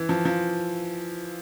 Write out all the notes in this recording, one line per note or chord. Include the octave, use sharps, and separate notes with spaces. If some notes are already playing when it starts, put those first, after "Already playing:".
Already playing: E3
F3
F3